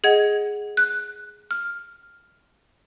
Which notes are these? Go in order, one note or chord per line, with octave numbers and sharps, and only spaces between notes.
G#4 D#5 F#5 G#6
F#6
F6